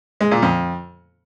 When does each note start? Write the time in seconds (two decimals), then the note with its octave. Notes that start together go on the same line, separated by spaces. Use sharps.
0.21 G#3
0.31 A#2
0.42 F2